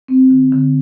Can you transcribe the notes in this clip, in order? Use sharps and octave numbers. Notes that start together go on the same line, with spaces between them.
C4
D3
D3